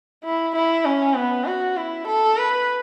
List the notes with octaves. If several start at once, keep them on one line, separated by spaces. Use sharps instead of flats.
E4
E4
C#4
B3
F#4
E4
A4
B4